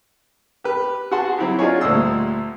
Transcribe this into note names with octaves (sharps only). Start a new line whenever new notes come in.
G4 B4
F#4 G#4 F#5 A5 C6
F#3 C4 E4 G4
D4 D#4 F4 G#4 C#5
D2 A#2 G3 C#6 D#6 E6